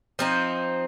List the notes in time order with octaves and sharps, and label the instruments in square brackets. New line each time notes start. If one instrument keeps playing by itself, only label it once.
[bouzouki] F3 C4 D#4